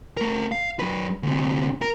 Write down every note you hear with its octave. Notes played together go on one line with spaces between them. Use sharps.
A3 A#4
F5
F#2 B4
D2 C3
A#4